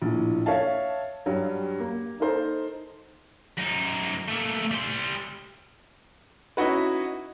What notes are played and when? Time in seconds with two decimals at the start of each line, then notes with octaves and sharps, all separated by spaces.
0.02 A#1 A2
0.46 C#5 E5 F5 A5
1.26 G2 F#3 G3
1.80 A#3
2.20 D#4 A4 A#4 C5
3.57 F#2 D#4
4.28 A3 A#3
4.71 G3 C6
6.57 C#4 D#4 E4 F#4 B4